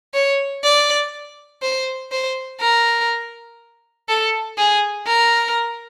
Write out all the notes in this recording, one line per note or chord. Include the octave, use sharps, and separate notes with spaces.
C#5
D5
C5
C5
A#4
A4
G#4
A#4